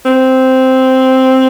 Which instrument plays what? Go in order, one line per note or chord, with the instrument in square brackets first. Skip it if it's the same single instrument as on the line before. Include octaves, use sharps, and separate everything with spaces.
[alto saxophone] C4